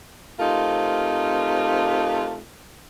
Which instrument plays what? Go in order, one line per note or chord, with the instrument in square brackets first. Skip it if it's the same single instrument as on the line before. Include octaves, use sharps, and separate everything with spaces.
[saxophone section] C3 A3 C4 D#4 F4 A#4